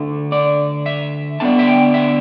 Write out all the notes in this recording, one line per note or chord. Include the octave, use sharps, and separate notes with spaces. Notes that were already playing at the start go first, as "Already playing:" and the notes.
Already playing: D3 A3 D4
D5
E5
D3 B3 D4 A5
E5
G5
E5